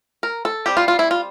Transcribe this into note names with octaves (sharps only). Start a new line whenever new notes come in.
A#4
A4
G3 C4 G4
F4
F4
E4
F4